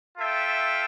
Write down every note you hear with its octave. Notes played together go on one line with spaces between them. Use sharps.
F4 A4 E5 G5